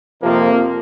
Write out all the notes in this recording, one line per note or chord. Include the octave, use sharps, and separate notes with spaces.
F2 C3 F3 A#3